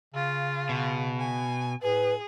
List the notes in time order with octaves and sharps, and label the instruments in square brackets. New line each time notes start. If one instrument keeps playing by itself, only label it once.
[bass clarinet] C#3 [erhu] F4
[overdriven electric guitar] B2
[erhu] G#5
[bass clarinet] A2 [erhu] G#4 [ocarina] B4